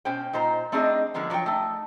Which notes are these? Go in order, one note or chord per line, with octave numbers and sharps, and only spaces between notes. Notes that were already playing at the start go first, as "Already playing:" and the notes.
B2 C#4 C5 G5
A#2 D#4 C5 A#5
A3 C4 D4 D#4 G#4 D#5
D3 F3 G#3 A#3 B3
F3 F#3 C5 C#5 G5
A3 D#4